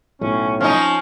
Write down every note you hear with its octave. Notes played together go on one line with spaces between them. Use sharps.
B1 A2 C#4
F3 C#4 D#4 C#5